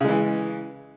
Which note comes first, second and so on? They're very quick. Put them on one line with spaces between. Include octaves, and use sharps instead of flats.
C#3 G#3 E3